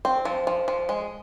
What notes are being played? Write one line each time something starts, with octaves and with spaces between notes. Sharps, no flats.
C4
F3
F3
F3
G#3